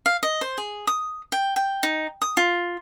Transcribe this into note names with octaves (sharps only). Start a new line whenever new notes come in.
F5
D#5
C5
G#4
D#6
G5
G5
D#4
D#6
F4